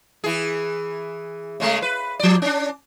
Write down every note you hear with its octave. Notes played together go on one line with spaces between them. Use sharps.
E3 G#4
C#3 G#3 A3
B4
F3 D5
C#4 D4